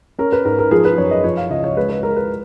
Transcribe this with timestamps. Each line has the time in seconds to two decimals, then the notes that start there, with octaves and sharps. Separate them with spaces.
0.19 C#4 A#4
0.32 B4
0.45 G#2 A#4
0.59 A#4
0.71 F3 G#4
0.85 B4
0.98 F#2 C#5
1.11 D#5
1.24 F3 C#5
1.37 F5
1.50 C#2 D#5
1.64 C#5
1.77 G#3 B4
1.89 B4
2.03 G#3 A#4
2.16 B4